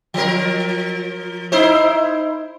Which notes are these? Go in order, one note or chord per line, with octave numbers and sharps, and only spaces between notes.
F3 A#4
D#4 E4 C5